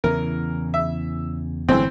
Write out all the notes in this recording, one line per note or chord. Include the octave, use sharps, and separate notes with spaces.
E2 C#3 E3 A#4
E5
G1 A2 E3 C4